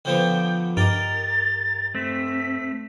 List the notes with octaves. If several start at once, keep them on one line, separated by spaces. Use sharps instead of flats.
D3 F3 B3 G5
G2 G4 A#4 D#5 A6
A3 C4 B6